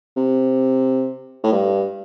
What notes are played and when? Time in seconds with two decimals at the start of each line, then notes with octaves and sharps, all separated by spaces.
0.16 C3
1.43 A2
1.52 G2